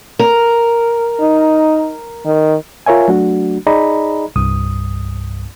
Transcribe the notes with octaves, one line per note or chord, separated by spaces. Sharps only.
A#4
D#4
D#3
F4 A#4 C#5 E5 G#5
F#3 A3 D4 F#4
D#4 G#4 D5 D#5 A#5 B5
C2 G2 D#6